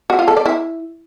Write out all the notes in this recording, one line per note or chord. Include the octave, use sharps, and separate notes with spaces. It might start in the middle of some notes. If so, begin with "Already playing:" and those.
F#4
F4
A4
D5
E4